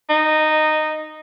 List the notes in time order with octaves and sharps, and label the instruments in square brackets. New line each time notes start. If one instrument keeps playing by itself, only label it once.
[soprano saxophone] D#4